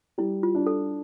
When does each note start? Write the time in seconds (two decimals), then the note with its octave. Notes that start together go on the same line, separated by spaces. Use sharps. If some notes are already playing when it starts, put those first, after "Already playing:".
0.18 G3 E4
0.43 F4
0.55 D4
0.67 A4